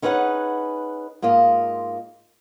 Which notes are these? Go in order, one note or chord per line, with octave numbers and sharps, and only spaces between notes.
C#4 D#4 G#4 B4 D#5 F#5
G#2 A#3 F4 D#5